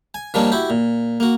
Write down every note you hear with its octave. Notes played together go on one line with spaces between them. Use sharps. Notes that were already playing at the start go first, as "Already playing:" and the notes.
G#5
D#3 F3 G3 A#3 C#4 D4
E4 F#4 G4
A#2
A#3 F#4